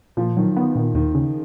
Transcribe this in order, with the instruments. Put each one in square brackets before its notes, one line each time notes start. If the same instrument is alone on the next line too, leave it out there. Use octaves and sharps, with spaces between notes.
[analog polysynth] A#2 [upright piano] F3
[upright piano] D#3 [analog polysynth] F#3
[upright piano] D#3 [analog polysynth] B3
[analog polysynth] A#2 [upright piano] D#3
[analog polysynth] D#2 [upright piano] D#3
[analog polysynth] C#3